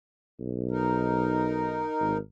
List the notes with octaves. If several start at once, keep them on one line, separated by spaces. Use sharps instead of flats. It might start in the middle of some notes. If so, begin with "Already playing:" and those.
B1
D#4 A#4
G#1